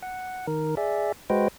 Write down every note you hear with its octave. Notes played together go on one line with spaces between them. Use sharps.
F#5
D#3 A#4
G#4 D5 E5
G#3 F#4 B4 C5 D#5 G5